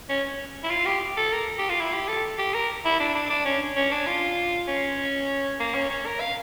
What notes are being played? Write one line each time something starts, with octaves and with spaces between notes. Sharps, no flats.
C#4
E4
F4
G4
A4
A#4
G4
F4
E4
G4
A4
G4
A#4
E4
D4
D4
D4
C#4
C#4
D4
F4
C#4
A#3
C#4
C#4
A#4
F5